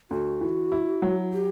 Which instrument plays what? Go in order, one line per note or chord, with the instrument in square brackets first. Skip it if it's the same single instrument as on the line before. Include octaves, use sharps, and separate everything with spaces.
[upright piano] D2 [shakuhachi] F#4
[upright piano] E3
E4
F#3
[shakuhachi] G4